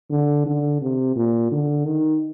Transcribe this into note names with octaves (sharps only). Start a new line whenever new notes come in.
D3
D3
C3
A#2
D3
D#3